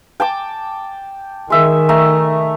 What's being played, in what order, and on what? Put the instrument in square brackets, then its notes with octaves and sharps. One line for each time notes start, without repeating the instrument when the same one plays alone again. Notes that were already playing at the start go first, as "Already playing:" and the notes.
[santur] G5 A5 D6
[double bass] D#3 [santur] G#3 E5
[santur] A3 E5 A#5